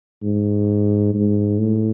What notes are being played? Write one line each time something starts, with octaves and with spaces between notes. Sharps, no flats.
G#2
G#2
A2